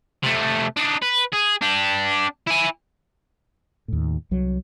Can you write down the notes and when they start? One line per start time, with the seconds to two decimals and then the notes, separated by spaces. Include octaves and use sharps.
0.23 C3 A3
0.77 D4 D#4
1.02 B4
1.33 G#4
1.62 D4 G4
2.47 E4 G#5
3.88 D#2 A2
4.31 C2 F#3